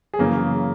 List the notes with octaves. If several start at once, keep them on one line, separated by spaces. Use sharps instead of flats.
G#4
F#2 C#3 E3 A#3 A#4